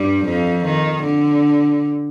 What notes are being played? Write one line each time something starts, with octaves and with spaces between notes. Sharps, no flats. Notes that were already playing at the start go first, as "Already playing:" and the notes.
Already playing: G2 G3
F2 F3
D#3
D3